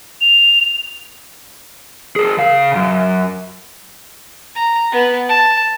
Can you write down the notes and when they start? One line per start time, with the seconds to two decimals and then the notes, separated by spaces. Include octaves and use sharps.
0.21 F7
2.16 G#4 A#4
2.38 C#3 F5
2.75 F#2
4.56 A#5
4.92 B3
5.29 A5